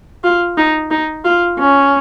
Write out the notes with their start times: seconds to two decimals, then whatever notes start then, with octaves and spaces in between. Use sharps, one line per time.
0.24 F4
0.57 D#4
0.91 D#4
1.25 F4
1.59 C#4